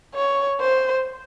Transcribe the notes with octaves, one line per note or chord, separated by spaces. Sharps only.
C#5
C5